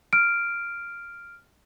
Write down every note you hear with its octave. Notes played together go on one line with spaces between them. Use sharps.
F6 D7